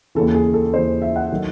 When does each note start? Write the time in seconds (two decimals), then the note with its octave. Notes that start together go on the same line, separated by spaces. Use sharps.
0.15 D#2 C#3 E3 A4
0.35 G#4
0.54 A4
0.73 D#2 C#3 E3 C5
1.02 E5
1.16 F#5
1.32 D#3 F#3 A3